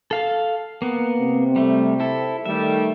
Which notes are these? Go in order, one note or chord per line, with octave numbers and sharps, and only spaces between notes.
A4 F5 A5
A#3 B3
C3 C4
G3 A3
E4 A4
D#3 G3 A3 E5